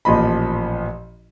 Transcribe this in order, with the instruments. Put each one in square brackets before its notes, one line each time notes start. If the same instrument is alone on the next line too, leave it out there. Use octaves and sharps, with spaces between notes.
[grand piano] A1 A#2 F3 D#5 B5